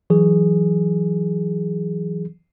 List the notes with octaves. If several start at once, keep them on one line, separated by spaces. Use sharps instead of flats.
E3 F#3 G#4